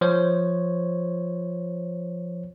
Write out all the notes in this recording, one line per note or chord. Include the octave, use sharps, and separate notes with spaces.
F3 C5 C#5